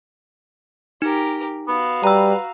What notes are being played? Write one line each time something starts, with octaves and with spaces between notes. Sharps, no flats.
D#4 G4 A#4
B3 F#4 F5
G3 B4 A#5 E6